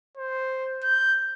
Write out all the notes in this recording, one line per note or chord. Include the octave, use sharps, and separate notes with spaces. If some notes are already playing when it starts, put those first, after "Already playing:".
C5
G6